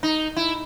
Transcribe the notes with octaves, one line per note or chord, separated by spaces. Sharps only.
D#4
E4